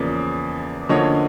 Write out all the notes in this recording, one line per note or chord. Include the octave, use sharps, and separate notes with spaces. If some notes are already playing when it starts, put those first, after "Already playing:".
Already playing: E2 C#3 F3 A#3 D5
D2 D3 F3 A#3 C#4 C#5 D#5